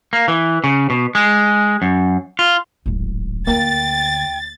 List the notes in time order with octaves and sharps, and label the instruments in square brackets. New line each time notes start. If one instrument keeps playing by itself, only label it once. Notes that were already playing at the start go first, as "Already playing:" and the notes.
[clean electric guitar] A#3
E3
C#3
B2
G#3
F#2
F4
[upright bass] D1 G#1
[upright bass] D2 [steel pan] A#3 [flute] G5 [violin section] A6